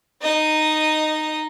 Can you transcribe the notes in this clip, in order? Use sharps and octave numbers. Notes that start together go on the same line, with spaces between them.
D#4 D#5